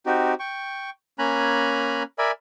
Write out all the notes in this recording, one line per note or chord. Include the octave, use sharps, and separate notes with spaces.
C4 D#4 F#4 G4
G5 C#6
A#3 C#4 G#5 A#5 B5 F#6
A#4 D5 E5 G#5 B5